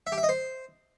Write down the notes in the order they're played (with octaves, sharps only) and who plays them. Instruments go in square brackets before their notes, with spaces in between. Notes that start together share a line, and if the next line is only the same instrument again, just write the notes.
[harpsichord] E5
G4
E5
D#5
C5